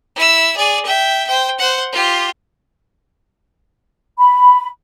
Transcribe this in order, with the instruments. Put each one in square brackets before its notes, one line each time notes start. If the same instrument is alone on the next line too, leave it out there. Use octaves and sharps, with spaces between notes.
[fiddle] E4 E6
G#4 D5
E5 G5
C5 G5
C5 F#5
F4 G4
[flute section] B5